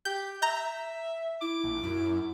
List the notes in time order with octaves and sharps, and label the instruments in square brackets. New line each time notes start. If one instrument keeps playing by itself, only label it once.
[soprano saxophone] G4 [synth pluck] G6
[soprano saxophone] E5 [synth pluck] A#5 G6
[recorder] E4 [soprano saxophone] D6
[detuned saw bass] A#1
[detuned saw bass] F#2 [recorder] E4